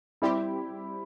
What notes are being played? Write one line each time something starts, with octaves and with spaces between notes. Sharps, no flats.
G3 C4 E4 G4